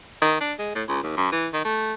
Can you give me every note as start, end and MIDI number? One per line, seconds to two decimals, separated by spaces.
0.21 0.37 51
0.41 0.53 62
0.59 0.71 56
0.75 0.83 45
0.88 0.99 37
1.03 1.14 39
1.17 1.28 42
1.32 1.48 52
1.53 1.60 51
1.64 1.93 57